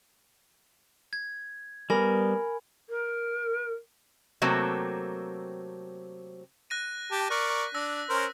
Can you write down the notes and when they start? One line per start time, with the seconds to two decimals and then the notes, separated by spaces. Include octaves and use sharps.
1.13 G#6
1.90 G3 B3 A#4 G#5 B5
2.89 A#4
4.42 C3 F#3 A3 A#3 C4
6.70 F#6 A#6 D#7
7.11 G4 A5
7.30 A#4 D5 C#6 F#6 A#6 B6
7.75 D4 E6 A#6
8.09 C#4 A#4 C5